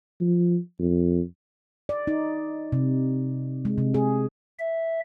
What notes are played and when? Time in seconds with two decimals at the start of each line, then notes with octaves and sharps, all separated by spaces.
0.20 F3
0.79 F2
1.89 D5
2.07 D#4
2.72 C3
3.65 G#3
3.78 C3
3.94 G#4
4.59 E5